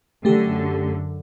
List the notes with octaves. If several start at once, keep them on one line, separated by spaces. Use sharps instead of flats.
F#2 D3 A3 G4